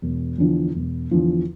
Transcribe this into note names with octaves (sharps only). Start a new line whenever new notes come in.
E1
E2 D3 F3
E1
E2 D3 F3